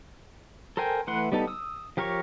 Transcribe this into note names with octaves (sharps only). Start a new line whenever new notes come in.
A4 A#4 C5 G5 G#5
E3 A3 B4 F#5 C6
G3 B3 D#4 A4
D#6 E6
F3 G4 A#4 C#5 C#6